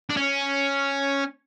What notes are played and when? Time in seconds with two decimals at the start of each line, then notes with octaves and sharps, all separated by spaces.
0.10 D4
0.17 C#4